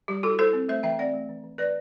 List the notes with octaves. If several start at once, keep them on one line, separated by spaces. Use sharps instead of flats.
G3 G4
E4 F#4 A4
E4 A4 C5
C4
A3 C5 E5
E3 E5 G5
C4 D5 F#5
A3
E3
E3
E3 B4 D5